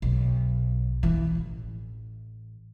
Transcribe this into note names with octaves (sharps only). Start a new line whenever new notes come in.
B1
E3
A1